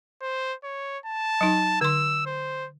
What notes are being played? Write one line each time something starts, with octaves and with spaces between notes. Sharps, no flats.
C5
C#5
A5
F#3 D#4
D3 C6 E6
C5